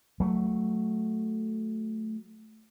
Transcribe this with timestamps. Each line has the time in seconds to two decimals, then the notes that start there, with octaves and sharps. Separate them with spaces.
0.20 F#3 A3